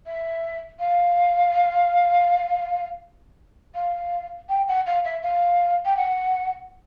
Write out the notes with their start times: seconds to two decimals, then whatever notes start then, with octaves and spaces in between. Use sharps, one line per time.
0.06 E5
0.79 F5
3.74 F5
4.49 G5
4.68 F#5
4.86 F5
5.04 E5
5.22 F5
5.85 G5
5.96 F#5